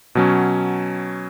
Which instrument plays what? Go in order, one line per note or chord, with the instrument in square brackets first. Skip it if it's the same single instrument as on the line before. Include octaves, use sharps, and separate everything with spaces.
[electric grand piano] B2 F#3 C#4